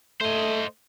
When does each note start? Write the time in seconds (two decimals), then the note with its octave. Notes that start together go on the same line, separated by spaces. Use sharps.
0.21 A3 C5 D#5